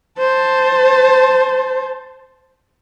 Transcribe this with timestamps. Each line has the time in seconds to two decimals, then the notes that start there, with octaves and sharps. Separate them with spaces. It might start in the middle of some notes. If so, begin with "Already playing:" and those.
0.19 C5 A5